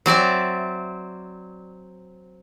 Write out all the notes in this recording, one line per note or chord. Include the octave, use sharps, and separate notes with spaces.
F#3 C4 D5 E5